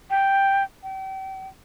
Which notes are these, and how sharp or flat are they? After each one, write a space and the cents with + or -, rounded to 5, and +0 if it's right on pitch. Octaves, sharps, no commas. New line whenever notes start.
G5 +0
G5 -35